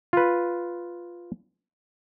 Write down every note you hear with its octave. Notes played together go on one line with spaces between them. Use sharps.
F4 B4